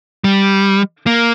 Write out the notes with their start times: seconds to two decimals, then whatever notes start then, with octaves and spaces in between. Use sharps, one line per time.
0.24 G3
1.07 A#3